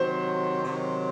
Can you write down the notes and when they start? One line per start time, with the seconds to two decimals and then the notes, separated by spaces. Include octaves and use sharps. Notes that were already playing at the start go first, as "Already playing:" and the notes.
Already playing: C3 D#3 F#3 C5
0.65 C3 D#3 F#3